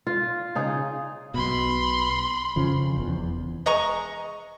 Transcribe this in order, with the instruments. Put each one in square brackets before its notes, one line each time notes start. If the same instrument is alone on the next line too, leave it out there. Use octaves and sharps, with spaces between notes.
[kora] F4
C#3 D#4 G#4
[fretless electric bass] B1 B2 [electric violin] B5 C6
[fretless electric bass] F2 C#3 F3
F1 E2
[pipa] G#3 D#5 A#5 C#6